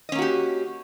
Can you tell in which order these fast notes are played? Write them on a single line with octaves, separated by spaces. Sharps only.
D#5 C#4 A#3 F#4 G4